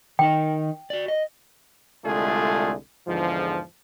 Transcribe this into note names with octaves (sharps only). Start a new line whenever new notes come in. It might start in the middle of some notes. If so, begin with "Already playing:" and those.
D#3 D#4 D#5 G5
F#4 D5
D#5
C2 D3 G#3 A3 F4 G#4
E2 G#2 D3 F3